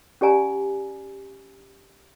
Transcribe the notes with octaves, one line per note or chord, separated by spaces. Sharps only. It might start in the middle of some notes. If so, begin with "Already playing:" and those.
C#4 G4 D5 G#5 A#5